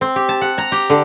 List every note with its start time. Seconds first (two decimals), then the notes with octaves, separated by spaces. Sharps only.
0.01 C4
0.16 G4
0.29 A5
0.41 F#5
0.58 A#5
0.72 G4
0.90 D3